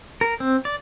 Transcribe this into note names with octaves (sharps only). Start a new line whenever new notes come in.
A#4
C4
D5